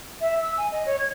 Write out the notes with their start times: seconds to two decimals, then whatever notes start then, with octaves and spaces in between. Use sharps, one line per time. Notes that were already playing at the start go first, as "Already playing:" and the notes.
0.21 E5
0.42 E6
0.58 G#5
0.72 D#5
0.86 C#5
0.99 G#6